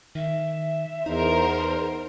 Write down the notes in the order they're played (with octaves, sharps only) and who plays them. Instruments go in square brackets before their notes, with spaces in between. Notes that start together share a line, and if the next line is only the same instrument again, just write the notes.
[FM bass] D#3 [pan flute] E5
[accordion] E2 [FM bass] D#4 [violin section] A#4 C5